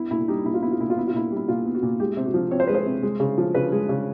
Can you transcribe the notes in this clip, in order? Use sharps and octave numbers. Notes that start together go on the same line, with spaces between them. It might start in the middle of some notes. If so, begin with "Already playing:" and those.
Already playing: B3 E4
A#2 E4
G3 D#4
A#2 E4
F4
B3 E4
F4
A#2 E4
F4
B3 E4
F4
A#2 E4
G3
E4
A#2 F4
B3
F#4
A#2
G#3 G4
C3
F#4
F3
C4 C#5
C5
G#3 B4
C5
C3
G#3
C#3
F3
C#3 B4
G#3
C#3